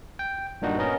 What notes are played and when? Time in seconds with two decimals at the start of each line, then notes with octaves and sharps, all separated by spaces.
0.19 G5
0.62 G2 A#2 D4 D#4 F#4
0.79 B3 C#4 A#4 D#5